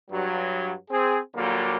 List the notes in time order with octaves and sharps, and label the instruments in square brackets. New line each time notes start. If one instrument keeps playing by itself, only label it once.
[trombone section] G2 F#3
C4 G#4
A#2 D3 F#3 G3 A#3